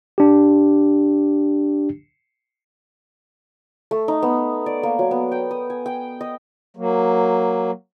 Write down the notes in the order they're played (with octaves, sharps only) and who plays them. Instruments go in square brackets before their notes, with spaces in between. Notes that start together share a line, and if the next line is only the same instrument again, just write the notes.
[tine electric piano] D4 G4
[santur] A3
D#4
B3
D5
A#3
F#3
B3
G5
D#6
G#5
G5
D#5
[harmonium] F#3 A#3